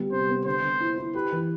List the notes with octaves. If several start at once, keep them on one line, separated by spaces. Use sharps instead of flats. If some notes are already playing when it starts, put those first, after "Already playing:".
Already playing: D3 G3 B3
C3 C5
B3
D3 C5
D3
E4
E4
G4 B4
E3